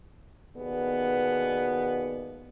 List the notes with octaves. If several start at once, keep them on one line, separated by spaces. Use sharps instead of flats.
D#2 B2 B3 G#4 D5